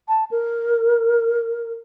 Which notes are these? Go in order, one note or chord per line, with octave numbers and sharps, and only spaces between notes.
A5
A#4